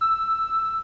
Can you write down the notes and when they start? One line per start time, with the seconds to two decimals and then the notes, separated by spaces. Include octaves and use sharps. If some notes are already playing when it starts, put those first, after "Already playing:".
0.01 E6